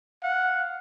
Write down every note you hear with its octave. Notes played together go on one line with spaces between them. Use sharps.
F5 F#5